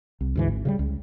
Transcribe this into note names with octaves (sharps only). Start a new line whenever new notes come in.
C2
D2 G#2 E3
G#1
C#3 E3 G3
C#2